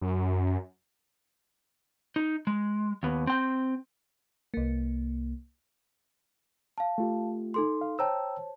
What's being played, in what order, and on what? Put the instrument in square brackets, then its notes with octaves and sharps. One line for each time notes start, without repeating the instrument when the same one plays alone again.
[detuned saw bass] F#2
[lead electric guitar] D#4
G#3
D#2 B3
C4 G5
[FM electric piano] C2 A#3
[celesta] F5 A5
[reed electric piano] A3 F4 G4
[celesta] D#4 A4 C6
[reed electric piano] F5
[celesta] C5 C#5 A5 [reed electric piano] G5 A#5 E6